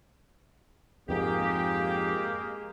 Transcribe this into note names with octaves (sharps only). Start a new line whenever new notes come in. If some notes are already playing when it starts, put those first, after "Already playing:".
F2 G#2 G#3 A#3 G4 G#4